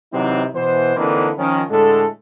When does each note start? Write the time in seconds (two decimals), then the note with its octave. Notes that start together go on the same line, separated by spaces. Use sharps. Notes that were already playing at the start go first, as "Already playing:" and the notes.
0.13 C3 E3 F#3 C4 D#4
0.55 B2 E3 C5
0.97 D3 E3 A#3 C4 D4 D#4
1.38 D#3 F3 C#4
1.70 A2 D3 G#3 A3 A4